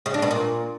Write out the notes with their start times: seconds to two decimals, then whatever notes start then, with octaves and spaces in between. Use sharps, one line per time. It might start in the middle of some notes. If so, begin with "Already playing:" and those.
0.06 C#3
0.14 D4
0.22 B2
0.31 A#2